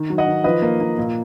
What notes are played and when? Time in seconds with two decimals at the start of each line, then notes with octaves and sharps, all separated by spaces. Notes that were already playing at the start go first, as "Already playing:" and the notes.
Already playing: D#3
0.10 F#3
0.18 D#5 F#5
0.27 D#3
0.44 F3 B4 D#5
0.62 A#3
0.80 A#3
0.98 A#2